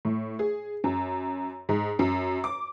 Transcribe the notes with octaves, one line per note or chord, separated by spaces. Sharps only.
A2
G#4
F#2
G#2
F#2
D6